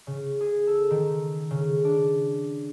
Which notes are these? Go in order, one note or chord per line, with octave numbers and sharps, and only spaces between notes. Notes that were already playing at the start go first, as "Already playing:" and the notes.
C#3
G#4
A4
D#3
C#3
D4